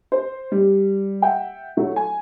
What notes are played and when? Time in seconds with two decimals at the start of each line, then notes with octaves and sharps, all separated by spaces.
0.12 C5
0.52 G3
1.22 E5 F#5 G5
1.77 F#3 A3 E4
1.96 G#5